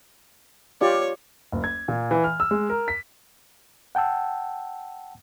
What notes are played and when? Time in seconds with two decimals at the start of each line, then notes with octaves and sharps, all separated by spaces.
0.81 F4 G4 C#5 D5
1.52 F#1
1.64 G#6
1.88 A#2
2.11 E3
2.24 F6
2.40 E6
2.51 G#3
2.69 A#4
2.88 B6
3.95 F#5 G5 A5 E6